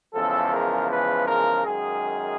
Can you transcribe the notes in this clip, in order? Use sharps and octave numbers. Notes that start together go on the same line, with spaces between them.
E2 C#3 F3 G#3 A4
A#4
B4
A#4
F#2 D#3 G#3 G#4